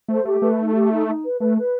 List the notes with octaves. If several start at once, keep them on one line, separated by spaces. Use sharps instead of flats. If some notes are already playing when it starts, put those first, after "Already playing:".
A3 C5
A3 G4
A3 B4
D#4
G4
D#4
D#4
B4
A3 B4
B4